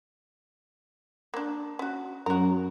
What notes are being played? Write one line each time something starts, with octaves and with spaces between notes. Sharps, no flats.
A#3 D4
C#4 F#4
F#2 F#4 A#4